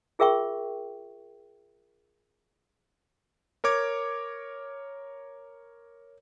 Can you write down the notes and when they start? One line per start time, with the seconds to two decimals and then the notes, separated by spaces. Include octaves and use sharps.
0.19 F4 G#4 A#4 E5 G5 C#6
3.64 A#4 C#5 D6 G#6